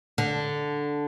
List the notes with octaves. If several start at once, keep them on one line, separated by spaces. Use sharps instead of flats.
D3